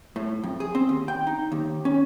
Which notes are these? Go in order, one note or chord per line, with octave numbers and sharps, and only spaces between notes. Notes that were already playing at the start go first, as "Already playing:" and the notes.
A2
F2
G#4
C4
D#2
G5
D#4
D#2
C#4